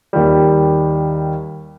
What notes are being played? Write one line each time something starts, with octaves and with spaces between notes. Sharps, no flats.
D#2 G3